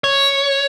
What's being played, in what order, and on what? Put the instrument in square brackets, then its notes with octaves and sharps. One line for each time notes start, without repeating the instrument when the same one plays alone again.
[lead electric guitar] C#5